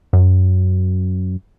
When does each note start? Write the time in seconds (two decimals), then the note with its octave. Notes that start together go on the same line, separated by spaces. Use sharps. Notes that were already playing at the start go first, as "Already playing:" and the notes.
0.13 F#2